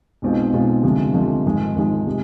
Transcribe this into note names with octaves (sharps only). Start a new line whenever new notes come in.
B1 B2 G#3 C4 F4
B1 B2 G#3 C4 F4
D2 C3 F3 G#3
D2 C3 F3 G#3
G#1 G#2 F3 G#3
G#1 G#2 F3 G#3
C3 G#3